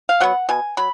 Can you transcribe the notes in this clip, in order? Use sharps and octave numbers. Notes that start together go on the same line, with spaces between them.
F5
F#3 B3 F#5
B2 G#5
F#3 B5